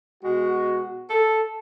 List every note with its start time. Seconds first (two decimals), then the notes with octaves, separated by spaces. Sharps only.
0.23 B2 G#3 F#4
1.10 A4